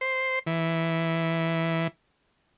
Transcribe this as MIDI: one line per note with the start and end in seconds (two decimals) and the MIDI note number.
0.01 0.39 72
0.47 1.88 52